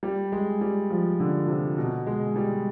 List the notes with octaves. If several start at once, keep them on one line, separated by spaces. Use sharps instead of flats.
G3
G#3
G3
F3
D3
C3
B2
G#3
G3